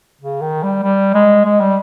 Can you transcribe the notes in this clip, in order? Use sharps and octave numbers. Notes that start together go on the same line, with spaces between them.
C#3
D#3
G3
G3
G#3
G#3
G3